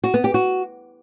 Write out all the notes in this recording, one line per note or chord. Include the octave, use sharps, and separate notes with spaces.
F#4
B3
G4
F#4